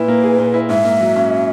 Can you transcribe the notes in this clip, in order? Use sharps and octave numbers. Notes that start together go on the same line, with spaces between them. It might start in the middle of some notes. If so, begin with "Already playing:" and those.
Already playing: A#2 E4 B4
A#3
G#4
A#2
E4
G#2 E5
A#3
F#3
C#4